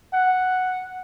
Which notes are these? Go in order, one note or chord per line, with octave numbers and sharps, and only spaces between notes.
F#5